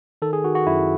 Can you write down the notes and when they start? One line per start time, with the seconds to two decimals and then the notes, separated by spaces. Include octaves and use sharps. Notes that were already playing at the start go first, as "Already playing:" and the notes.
0.22 D#3 A4
0.33 G#4
0.44 D#3 F#4
0.55 F#4
0.67 F#2 E4